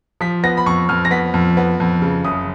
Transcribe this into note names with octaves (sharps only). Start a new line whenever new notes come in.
F3 B6
B3 A#6
B5
F2 C#6
F2 F6
A#6
B3 B6
F2
B3
F2
C#3
F#1 D#6